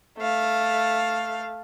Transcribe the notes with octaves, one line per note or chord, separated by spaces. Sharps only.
A3 F5